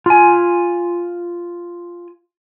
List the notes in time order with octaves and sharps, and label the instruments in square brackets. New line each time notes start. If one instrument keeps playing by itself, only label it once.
[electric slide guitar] F4 G#5